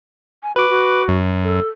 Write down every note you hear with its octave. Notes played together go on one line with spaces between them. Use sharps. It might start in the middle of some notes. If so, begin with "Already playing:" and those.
G#5
F#4 B4 D6
F#4
F#2
A4